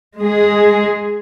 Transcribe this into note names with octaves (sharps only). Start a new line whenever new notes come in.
G#3 G#4